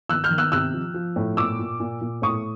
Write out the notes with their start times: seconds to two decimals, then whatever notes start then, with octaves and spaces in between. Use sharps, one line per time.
0.09 D#3 E6 F#6
0.24 F6 G6
0.31 D#3
0.38 E6 F#6
0.52 C3 E6 F#6
0.74 F3
0.94 F3
1.16 A2
1.37 A#2 D6 E6
1.59 A#2
1.80 A#2
2.01 A#2
2.22 A2 C#6 D#6